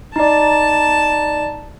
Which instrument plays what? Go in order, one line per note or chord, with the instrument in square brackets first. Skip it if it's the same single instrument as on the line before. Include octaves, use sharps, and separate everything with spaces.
[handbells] D#4 D5 [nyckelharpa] A5